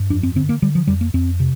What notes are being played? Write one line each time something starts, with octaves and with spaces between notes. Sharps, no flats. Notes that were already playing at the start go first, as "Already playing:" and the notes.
Already playing: G2
F2 D4
C4
D3 C4
A#3
D3 G3
F3
F2 G3
A#3
F2 C4
C3